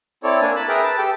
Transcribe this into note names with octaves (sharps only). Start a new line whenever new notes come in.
C4 E4 A4 C#5 D5
A#3 D4 G#5
A5 B5
G#4 A#4 B4 E5 G5
B4 A5
G4 A4 G5